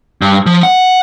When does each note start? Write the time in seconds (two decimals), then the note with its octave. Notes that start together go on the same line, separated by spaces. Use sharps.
0.22 G2
0.46 F3
0.63 F#5